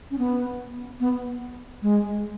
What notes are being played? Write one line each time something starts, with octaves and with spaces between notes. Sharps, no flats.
C#4
B3
B3
G#3